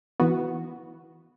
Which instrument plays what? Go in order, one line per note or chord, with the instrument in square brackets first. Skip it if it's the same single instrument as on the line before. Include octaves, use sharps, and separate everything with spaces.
[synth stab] E3 B3 F#4